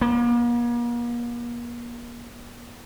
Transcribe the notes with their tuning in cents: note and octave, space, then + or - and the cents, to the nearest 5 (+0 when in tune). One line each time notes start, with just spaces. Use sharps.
A#3 +40